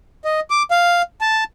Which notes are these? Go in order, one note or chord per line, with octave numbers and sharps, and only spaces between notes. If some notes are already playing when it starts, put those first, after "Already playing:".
D#5
D6
F5
A5